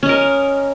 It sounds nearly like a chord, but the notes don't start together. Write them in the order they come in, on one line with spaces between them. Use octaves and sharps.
C#4 D#5 A#4